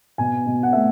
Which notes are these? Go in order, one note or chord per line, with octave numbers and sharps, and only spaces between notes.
B2 G#5
B2
F#5
A3 E5